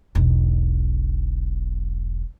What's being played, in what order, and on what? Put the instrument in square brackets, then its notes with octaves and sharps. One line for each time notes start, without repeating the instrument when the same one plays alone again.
[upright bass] E1 B1